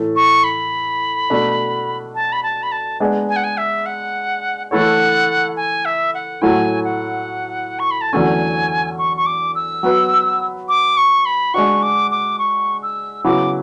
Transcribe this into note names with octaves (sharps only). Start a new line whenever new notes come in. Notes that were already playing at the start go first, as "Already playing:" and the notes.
Already playing: A2 E3 A3
C#6
B5
B2 A3 D4
A5
B5
A5
B5
A5
G#3 B3 D4 G#4
G#5
F#5
G#5
E5
F#5
E3 A3 E4 A4 C#5 F#5
G#5
E5
F#5
A2 F#3 A3 E4 G#5
F#5
C#6
B5
A5
E2 D3 F#3 A3 C#4 G#5
C#6
C#6
D6
E6
F#3 B3 F#4 B4
D6
C#6
B5
G#3 D4 F#4 C#6
D6
D6
C#6
E6
C#3 F#3 B3 E4 D6